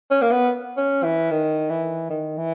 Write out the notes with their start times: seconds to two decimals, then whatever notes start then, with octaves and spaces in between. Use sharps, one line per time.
0.11 C#4
0.21 A#3
0.31 B3
0.77 C#4
1.04 E3
1.31 D#3
1.70 E3
2.10 D#3
2.37 E3